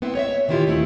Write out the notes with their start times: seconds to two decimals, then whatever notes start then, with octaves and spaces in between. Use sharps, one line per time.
0.02 B3 C4 E4
0.15 C#5 D#5 E5
0.48 A#2 D#3 E3 E4 F4 G4
0.67 D#2 D#3 A3 C4 E4